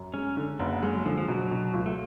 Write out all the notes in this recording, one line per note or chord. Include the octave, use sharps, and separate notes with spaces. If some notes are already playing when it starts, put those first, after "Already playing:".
Already playing: F#2
G#3 C#4
D3
F#1 B3
F#3 G#3
D3 F3
F3
B2 F#3
B2
C#2
A3